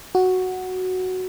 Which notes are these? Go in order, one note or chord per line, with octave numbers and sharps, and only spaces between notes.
F#4